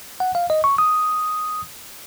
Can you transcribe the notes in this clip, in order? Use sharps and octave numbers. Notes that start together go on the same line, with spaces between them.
F#5
F5
D#5
C#6
D#6